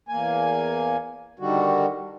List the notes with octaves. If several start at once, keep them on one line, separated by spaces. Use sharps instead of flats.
E2 A#3 G#5
D3 D#3 G3 F#4